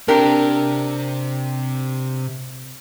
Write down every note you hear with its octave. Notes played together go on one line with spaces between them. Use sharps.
C3 D4 G4 A#4